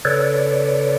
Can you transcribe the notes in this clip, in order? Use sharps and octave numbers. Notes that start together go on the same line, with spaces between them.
C#3 A4 B4 C#5 D5